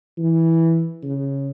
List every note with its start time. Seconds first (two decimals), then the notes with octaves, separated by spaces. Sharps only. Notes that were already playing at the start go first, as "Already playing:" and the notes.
0.18 E3
1.03 C#3